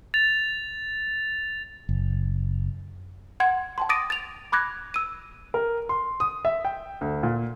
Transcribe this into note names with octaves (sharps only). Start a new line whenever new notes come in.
A6 F7
F#1
F#5 C6 G#6
G5 A5 C6
D6 D#6 A6 A#6 D7 D#7
A6 F7
B5 D6 F#6 G#6 A#6
E6 D#7
A#4
C6
D#6
E5
G5
D2
A#2